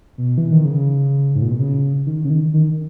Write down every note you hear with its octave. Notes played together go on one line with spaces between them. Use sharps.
B2
E3
D#3
C#3
G#2
A#2
B2
C#3
D#3
C#3
D#3
D#3